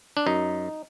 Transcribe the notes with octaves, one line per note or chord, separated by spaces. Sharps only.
D4
F#2 D#4